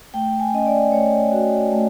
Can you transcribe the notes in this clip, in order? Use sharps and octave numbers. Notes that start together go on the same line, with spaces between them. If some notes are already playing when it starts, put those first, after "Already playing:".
A3 G5
G#5
C#4 D#5
D5
A3 C#5
F#4
A3